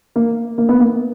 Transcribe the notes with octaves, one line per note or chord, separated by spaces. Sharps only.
A#3
A#3
B3
A#3